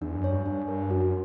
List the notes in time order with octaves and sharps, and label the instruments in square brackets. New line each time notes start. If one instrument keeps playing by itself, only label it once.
[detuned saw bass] E2 [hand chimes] D4
[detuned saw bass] F#2
[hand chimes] C#5
[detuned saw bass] G2
[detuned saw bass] G2 [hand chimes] D4
[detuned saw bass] G2 [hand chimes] A#4
[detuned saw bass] F#2 [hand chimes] F#4